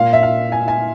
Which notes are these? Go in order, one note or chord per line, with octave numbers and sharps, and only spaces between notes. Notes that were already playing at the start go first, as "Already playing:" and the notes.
Already playing: A#2 F5
E5
F5
G#5
G#5